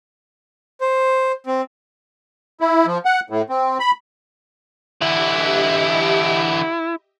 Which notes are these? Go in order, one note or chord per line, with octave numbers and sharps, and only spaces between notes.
C5
C4
E4
F3
F#5
A2
C4
B5
D3 E3 E4 G4 D#5 E5